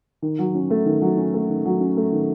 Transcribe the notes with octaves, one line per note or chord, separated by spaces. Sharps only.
D#3
F#3
C#4
A3
D#3
F#3
C#4
A3
D#3
F#3
C#4
A3
D#3